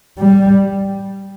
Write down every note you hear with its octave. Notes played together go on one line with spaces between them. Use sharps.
G3